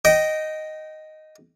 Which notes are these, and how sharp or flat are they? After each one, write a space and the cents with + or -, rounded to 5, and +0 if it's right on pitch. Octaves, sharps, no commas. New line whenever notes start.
D#5 +0 G5 -25